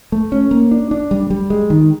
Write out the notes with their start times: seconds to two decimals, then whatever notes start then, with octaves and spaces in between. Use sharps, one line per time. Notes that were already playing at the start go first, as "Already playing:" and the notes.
0.12 A3
0.32 C#4
0.51 A#3
0.71 D4
0.91 D4
1.11 G3
1.30 G3
1.50 G#3
1.70 D#3